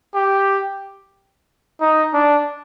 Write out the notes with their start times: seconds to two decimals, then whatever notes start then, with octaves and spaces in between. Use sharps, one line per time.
0.14 G4
1.81 D#4
2.14 D4